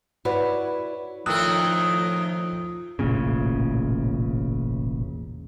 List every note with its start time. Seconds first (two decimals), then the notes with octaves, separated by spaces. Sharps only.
0.25 E4 F#4 B4 C#5 D5
1.26 A2 D#3 F3 D#4 A#4 D#6 E6 F#6
2.99 E1 A1 A#2 C#3